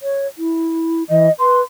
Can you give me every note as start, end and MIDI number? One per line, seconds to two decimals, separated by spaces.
0.02 0.27 73
0.38 1.03 64
1.10 1.27 52
1.10 1.31 75
1.39 1.62 71
1.39 1.57 84